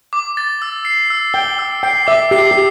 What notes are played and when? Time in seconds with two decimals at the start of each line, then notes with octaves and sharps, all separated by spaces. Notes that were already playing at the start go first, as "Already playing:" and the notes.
0.13 D6
0.37 A6
0.62 E6
0.85 C7
1.10 E6
1.34 G5 G7
1.59 E6
1.83 G5 C7
2.07 E5 D6
2.31 G4 C7
2.51 G4